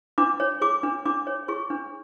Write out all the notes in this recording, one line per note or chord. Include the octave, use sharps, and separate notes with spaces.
D4 D6
C#5
G#4 D6
D4
D4 D6
C#5
G#4 C#6
D4